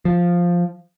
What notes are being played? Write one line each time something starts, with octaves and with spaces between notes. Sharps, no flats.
F3